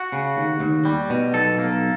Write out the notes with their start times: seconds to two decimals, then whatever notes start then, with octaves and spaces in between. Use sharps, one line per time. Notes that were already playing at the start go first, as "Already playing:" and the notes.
Already playing: F#4
0.12 C#3
0.37 D#2
0.60 D#2
0.85 G3
1.10 B2
1.33 B1 A4
1.58 A#3